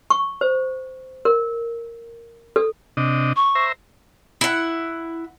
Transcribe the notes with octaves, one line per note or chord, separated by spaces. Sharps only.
C#6
C5
A#4
A4
C3 D4 D#5
C#6
C5 E5 A#5
E4 F#5